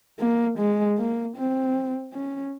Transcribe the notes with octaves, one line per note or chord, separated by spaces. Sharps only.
A#3
G#3
A#3
C4
C#4